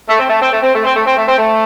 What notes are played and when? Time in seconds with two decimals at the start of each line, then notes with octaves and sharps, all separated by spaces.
0.08 A3
0.19 C4
0.30 A3
0.41 C4
0.52 A3
0.62 C4
0.74 A3
0.85 C4
0.96 A3
1.06 C4
1.16 A3
1.28 C4
1.38 A3